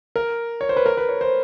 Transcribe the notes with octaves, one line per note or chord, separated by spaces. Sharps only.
A#4
C#5
C5
B4
A#4
B4
C#5
C5